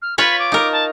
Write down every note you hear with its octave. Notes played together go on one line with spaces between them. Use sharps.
F6
F4 B4 C#5 B5
D6
D#4 A#4
A5